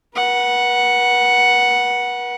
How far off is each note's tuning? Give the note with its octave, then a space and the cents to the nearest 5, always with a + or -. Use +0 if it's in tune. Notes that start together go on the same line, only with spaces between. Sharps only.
B4 -40 F#5 +0